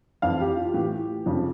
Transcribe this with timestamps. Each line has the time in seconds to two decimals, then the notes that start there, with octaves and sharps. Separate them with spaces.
0.22 F2 E3 F5
0.40 G4
0.56 F4
0.74 A2 E3 G4
1.26 F2 C#3 F3